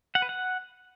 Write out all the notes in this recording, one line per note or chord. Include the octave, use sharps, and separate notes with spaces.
F#5
B4
F#5